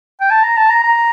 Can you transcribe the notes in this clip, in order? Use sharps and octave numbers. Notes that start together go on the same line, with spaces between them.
G5
A5
A#5
A5
A#5
A#5